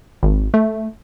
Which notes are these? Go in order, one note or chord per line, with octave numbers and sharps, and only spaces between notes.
G#1
A3